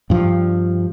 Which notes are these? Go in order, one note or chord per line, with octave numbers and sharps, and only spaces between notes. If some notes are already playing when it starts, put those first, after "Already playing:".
G2 F3